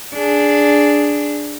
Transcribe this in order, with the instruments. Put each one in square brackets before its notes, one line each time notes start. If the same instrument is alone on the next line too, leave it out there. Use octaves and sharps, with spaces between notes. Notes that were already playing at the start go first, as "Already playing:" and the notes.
[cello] D4 G#4